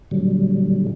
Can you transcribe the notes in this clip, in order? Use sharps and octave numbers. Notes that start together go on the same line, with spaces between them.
A#2 D3 F#3 G3